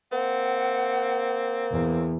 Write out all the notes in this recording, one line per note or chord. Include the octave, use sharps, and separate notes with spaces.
A#3 C4 F#5
E2